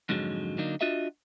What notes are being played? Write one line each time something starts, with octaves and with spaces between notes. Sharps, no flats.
F2 G#2 D3 F#3 G#3
D3 F#3 A#3 D4 D#4
D4 F4 F#4 D#5 E5